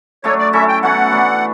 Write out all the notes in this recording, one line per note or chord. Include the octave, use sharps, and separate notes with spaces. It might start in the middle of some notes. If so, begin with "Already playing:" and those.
F#3 A3 D4 A4 C#5
D5
F#3 C#4 E4 A4 E5
G5
B2 F#3 A3 C#4 F#5
E3 A3 D4